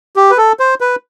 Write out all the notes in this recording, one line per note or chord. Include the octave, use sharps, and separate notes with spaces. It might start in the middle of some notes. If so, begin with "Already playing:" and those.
G4
B4
A4
C5
B4